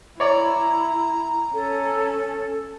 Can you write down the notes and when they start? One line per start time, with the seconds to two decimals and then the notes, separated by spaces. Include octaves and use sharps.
0.20 E4 C#5 D5 A#5
1.53 C#4 A4